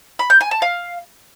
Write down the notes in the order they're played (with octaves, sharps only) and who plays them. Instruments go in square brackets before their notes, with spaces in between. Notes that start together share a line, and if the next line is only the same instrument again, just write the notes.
[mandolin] B5
G6
G#5
A5
F5